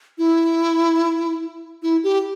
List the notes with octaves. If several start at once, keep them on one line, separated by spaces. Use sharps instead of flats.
E4
E4
G4